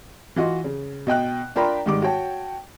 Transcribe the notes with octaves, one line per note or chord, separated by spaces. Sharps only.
E3 F4 F#4 D#5
C#3
B2 D#5 G5 F#6
D4 F4 A#4 G5 A#5 B5
G#2 D#3 G3 D6
F#4 C#5 G5 A5